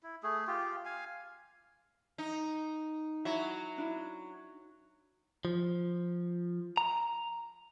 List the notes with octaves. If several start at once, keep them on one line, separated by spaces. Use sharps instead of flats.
E4
A3 G#4
F4 G4
F5 G#5
D#4
F#3 E4 E5
D4 E4
F3
A#5